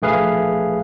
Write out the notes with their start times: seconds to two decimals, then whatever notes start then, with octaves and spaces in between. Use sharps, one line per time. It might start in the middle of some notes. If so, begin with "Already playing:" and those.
0.02 A#1 A3 G#4 B4 F5